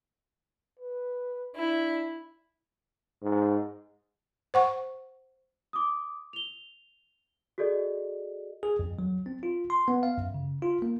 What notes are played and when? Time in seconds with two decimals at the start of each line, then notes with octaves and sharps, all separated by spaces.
0.79 B4
1.56 D4 E4
3.22 G#2
4.54 C5 F#5 C#6
5.73 D6 D#6
6.33 F7 G7
7.58 F#4 G#4 A4 D5 D#5
8.63 G#4
8.79 F2
8.99 F#3
9.26 C4
9.43 F4
9.70 C6
9.88 B3
10.03 F5
10.18 F#2
10.34 C#3
10.62 F4
10.82 A#3